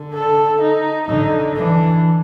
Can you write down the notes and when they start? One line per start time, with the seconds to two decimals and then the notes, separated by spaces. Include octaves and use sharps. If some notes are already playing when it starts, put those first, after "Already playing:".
Already playing: D3
0.14 A4
0.61 D#4
1.08 D3 D#4
1.56 E3 D4